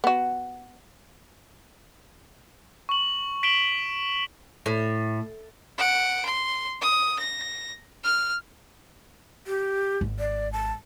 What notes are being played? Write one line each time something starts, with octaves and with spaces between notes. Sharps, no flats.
B3 F#4
C#6 F#7
B6 D7 E7 F#7 G7
A2
F#5 D7
C6
D#6
A#6
F6
G4
G#1
D5
A5